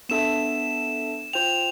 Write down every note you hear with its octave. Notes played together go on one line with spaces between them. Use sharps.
B3 D4 A4 E5 A5 E7
F4 C5 G5 F7